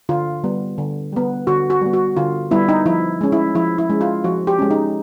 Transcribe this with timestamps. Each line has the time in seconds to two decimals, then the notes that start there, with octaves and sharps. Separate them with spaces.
0.09 D3 F4
0.44 G3 B3
0.78 D3
1.12 G3 B3
1.47 D3 F#4
1.70 F#4
1.82 G3 B3
1.93 F#4
2.17 D3 F4
2.51 G3 B3 E4
2.69 D#4
2.86 F3 E4
3.21 G#3 C#4
3.32 E4
3.55 F3 E4
3.78 E4
3.90 G#3 C#4
4.01 F4
4.24 F3 F#4
4.47 G4
4.59 G#3 C#4
4.71 D#4